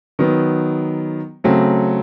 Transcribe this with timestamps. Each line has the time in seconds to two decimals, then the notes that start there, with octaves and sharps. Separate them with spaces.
0.19 D#3 F#3 B3
1.44 C#3 F#3 A3 C4